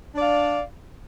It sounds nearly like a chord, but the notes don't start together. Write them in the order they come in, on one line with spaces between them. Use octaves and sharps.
D4 D5 F5